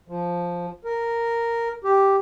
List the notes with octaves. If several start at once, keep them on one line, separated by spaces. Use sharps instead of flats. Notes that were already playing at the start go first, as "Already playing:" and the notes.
F3
A#4
G4